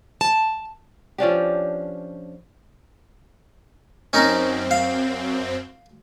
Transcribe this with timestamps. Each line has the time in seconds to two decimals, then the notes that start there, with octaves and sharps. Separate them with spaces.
0.21 A5
1.18 F3 C#4 D4 G4
4.13 F#2 C4 C#4 D#4 A#4
4.71 F5